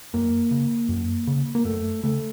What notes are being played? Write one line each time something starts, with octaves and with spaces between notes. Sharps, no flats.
F#2 A#3
C#3
F#2
C#3
A#3
F#2 A3
C#3 A3